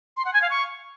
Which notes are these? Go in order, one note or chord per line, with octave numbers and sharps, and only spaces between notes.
C6
F#5
G#5
F5
C#6